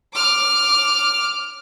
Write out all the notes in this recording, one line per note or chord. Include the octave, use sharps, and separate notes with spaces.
D6 F6